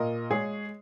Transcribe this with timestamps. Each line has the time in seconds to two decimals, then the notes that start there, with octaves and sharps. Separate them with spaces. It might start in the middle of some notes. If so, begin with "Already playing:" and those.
Already playing: A#2 A#4 D#5
0.31 G#3 G#4 C#5